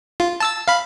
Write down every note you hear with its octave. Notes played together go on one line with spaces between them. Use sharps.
F4
A5 E6 A6
F5 B5